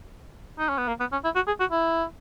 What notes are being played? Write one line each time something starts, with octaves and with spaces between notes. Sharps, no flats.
D#4
C#4
B3
A#3
B3
C#4
E4
F#4
G#4
F#4
E4